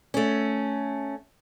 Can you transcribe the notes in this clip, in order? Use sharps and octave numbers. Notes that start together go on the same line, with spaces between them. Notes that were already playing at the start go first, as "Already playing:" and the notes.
A3 C#4